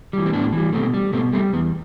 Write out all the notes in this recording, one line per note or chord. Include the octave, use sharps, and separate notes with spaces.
E3 G3
C4
A2 B3 D4
E3 G3
B2 A3 C4
G3
B2 A3 C4
G3 A3 C4
E2 B3